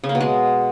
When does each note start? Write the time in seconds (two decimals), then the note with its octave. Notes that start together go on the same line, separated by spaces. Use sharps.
0.04 C#3
0.09 A#3
0.15 B2
0.20 G#3